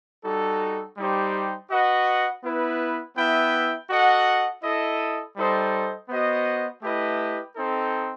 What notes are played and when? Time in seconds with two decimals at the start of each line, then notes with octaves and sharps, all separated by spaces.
0.25 G3 D#4 F#4 A4
0.98 G3 D#4 G4 C5
1.71 F#4 B4 D#5 F#5
2.44 B3 E4 B4
3.17 B3 E4 B4 E5 G5
3.90 F#4 A4 D#5 F#5
4.63 E4 A4 D#5
5.37 G3 D#4 A4 C5 D#5
6.09 B3 F#4 C5 D#5
6.83 A3 E4 G4 B4 D#5
7.56 C4 D#4 A4